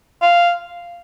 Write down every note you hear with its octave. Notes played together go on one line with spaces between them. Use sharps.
F5